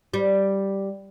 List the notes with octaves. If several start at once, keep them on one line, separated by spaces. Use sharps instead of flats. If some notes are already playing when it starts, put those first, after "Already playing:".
G3